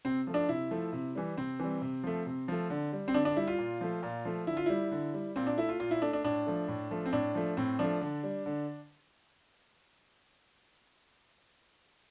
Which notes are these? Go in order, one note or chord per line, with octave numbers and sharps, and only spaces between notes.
C3 C4
F3 A3
D4
C3 E4
F3 A3
C3
E3 G3
C3 C4
E3 G3
C3
F3 A3
C3
F3 A3
D3
G3
C4
D3 D4
D4
G3 E4
F4
A#2
F3 A3
A#2
F3 A3
D3 E4
F4
G3 E4
D3
G3
A#2 C4
D4
A3 E4
F4
A#2 F4
E4
A3 D4
D4
A2 D4
F3 A3
A2
F3 A3
C4
A2 D4
F3 A3
A2 C4
F3 A3 D4
D3
G3
D3